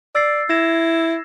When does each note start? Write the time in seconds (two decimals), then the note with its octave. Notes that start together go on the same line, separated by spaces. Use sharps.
0.15 D5 E6 A6 C7
0.49 E4 G#6 A#6 E7